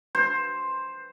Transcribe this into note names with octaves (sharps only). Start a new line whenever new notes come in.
C5